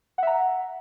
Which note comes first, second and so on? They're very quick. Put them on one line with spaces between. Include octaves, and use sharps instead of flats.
F#5 E5 A#5